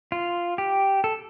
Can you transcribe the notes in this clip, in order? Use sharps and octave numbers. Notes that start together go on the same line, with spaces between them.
F4
G4
A4